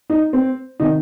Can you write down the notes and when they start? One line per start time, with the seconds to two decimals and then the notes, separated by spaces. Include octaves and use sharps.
0.10 D#4
0.33 C4
0.80 C3 D#3 D#4